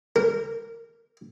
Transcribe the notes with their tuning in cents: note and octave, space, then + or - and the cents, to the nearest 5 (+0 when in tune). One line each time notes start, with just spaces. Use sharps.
A#4 -15